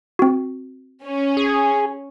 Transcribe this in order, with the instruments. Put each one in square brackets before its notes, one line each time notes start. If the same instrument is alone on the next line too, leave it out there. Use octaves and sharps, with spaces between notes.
[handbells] C4 F#4
[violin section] C#4
[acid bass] G#4